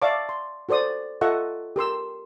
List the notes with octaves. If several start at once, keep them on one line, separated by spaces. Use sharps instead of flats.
D5 E5 F5 A5 C#6 D6
C6
F#4 A4 C5 D5 D#6
F4 A4 D#5 E5 F#5 C#6
G4 A#4 C6 E6